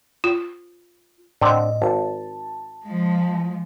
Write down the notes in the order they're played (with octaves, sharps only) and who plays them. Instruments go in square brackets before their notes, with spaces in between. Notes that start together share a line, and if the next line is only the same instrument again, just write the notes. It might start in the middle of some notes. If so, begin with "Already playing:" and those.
[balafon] F4
[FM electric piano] A2 D#5 [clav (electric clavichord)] D3 C4
[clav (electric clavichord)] G#1 [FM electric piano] A5
[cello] F3 G#3